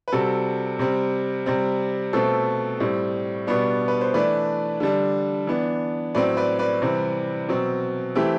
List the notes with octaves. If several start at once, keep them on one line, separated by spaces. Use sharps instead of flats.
B4
C3 G3 C4 F#4 A4
C3 G3 C4
C3 G3 C4
B2 A3 C4 A4 C5
A2 G3 C4
B2 G3 B3 D4
B4
C5
E3 A3 D4 B4 D5
D3 G3 D4
E3 B3 D4
A2 F#3 C4 B4 D5
B4 D5
B4 D5
C3 E3 G3 C4
B2 F#3 C4
E3 A3 C4 E4 G4